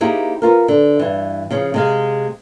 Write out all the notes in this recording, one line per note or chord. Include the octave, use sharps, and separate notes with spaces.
A#3 D#4 E4 G4 G#4 C5
B3 F4 A#4
D3
G2 E3
C#3 F3 C#4
C3 G#3 F5